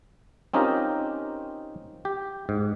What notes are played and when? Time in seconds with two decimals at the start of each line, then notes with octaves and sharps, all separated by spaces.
0.54 C4 C#4 D#4 F4 G4 A#4
2.05 G4
2.49 G#2